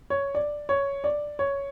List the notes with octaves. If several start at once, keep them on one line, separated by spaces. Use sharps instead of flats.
C#5
D5
C#5
D5
C#5